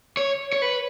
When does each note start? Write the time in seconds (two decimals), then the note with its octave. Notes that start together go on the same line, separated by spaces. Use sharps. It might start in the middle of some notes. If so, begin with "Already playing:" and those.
0.17 C#5
0.53 C#5
0.62 B4